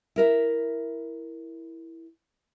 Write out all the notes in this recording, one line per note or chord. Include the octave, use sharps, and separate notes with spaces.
E4 A#4 E5